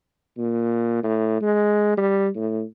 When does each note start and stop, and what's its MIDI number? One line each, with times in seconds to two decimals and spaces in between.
0.37 0.99 46
1.03 1.38 45
1.41 1.96 56
1.97 2.28 55
2.36 2.62 45